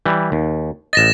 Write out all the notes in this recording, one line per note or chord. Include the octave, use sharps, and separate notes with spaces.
E3 G3
D#2
A1 D#5 A6 A#6 E7